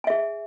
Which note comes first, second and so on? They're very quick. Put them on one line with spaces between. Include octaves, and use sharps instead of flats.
G#5 E5 G#4